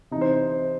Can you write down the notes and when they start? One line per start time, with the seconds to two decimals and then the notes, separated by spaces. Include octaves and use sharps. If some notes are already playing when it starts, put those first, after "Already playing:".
0.11 C3 E3 D#4
0.21 C5